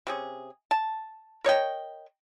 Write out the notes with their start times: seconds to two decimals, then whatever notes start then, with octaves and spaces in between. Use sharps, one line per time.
0.07 C3 C#4 G#4
0.71 A5
1.44 A#4 C#5 D#5 G5